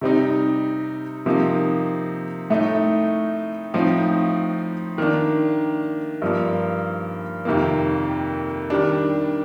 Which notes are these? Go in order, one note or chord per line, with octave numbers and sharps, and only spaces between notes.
C3 G3 C4 D#4
C3 F3 A#3 D#4
A2 A3 D#4
A2 F3 C4 D#4
D#3 A#3 D4
G2 F3 A#3
F2 C3 D#3 A#3
D#3 G3 D4